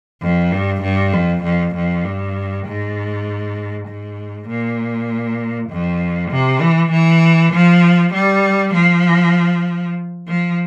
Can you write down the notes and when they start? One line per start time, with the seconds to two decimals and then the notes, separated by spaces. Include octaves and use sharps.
0.22 F2
0.52 G2
0.82 G2
1.13 F2
1.43 F2
1.75 F2
2.04 G2
2.66 G#2
3.88 G#2
4.48 A#2
5.70 F2
6.31 C3
6.61 E3
6.92 E3
7.53 F3
8.13 G3
8.74 F3
10.28 F3